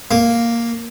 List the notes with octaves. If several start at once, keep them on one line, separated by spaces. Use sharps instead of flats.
A#3